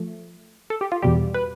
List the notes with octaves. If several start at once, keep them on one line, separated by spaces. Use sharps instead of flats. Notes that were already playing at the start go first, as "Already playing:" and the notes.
Already playing: F3 A3
A4
G4
F4
E2 B2 G3 G4
B4